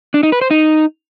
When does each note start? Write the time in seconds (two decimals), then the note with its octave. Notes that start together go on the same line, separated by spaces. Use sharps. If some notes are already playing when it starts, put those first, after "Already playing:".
0.14 D4
0.23 D#4
0.32 B4
0.41 C5
0.51 D#4